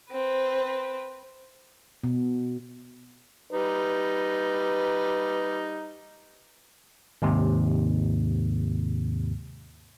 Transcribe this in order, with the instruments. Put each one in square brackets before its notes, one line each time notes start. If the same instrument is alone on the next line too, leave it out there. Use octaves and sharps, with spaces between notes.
[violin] C4 B4
[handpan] B2
[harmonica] G3 D#4 [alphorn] B4
[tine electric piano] D#2 G#2 C3